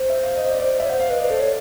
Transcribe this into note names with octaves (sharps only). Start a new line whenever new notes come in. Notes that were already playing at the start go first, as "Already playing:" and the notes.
Already playing: C5
E5
F5
D#5
D5
D5
E5
C#5
C5 F#5
F5
B4 D#5
D5
B4
A4 C5
C#5